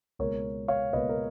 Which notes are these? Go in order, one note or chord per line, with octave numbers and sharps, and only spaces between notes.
C#2 B2 A#3 A#4 C#5
C#5 F5
C#2 B2 A#3 B4 D#5
A#4